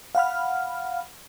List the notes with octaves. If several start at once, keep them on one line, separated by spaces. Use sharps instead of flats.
F5 F#5 B5 F6